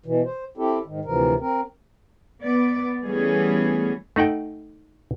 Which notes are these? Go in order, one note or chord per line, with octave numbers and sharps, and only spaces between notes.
B2 E3
C5
C4 E4 G4 A4
G#2 D#3
D2 C3 E3 F3 A#4
C4 A#4
B3 D5
E3 G3 A3 B3 C#4 G#4
A3 D#4 F#5 G5